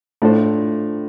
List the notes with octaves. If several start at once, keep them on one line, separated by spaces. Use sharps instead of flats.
A2 A3 D4 F4 A4 C5